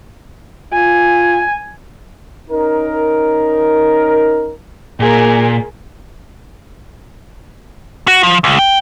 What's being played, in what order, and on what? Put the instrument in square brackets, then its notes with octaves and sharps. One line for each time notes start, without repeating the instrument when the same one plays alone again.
[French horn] F4 [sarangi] G#5
[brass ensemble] C#4 D#4 A#4
[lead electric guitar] A#2 [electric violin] G#4 A#4
[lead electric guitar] F#4
F3
C#2
G5